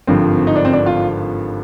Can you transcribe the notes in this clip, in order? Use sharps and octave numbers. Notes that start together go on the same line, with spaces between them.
G#1 G2 D3 F3 C4
D#4
D4
C4
D4
F4